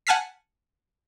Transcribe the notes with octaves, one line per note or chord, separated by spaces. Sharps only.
F#5 G#5 A5 F6 B6 C7